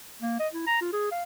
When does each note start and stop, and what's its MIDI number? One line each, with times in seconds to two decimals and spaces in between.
0.22 0.38 58
0.39 0.48 75
0.53 0.66 64
0.67 0.77 82
0.81 0.91 65
0.93 1.11 68
1.11 1.23 77